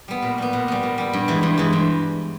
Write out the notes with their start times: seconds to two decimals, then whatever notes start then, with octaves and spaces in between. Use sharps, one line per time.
0.08 G3 B3
0.22 A#2
0.38 G3 B3
0.53 A#2
0.68 G3 B3
0.83 A#2
0.98 G3 B3
1.13 G2
1.28 E3 G#3
1.43 G2
1.58 E3 G#3
1.73 G2